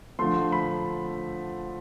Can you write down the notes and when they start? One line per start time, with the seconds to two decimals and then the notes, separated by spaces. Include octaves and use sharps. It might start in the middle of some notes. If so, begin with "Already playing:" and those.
0.19 D3 F3 A3 C6
0.52 B5